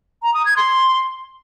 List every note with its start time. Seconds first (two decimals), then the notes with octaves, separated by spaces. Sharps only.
0.23 A#5
0.34 D#6
0.45 G#6
0.57 C6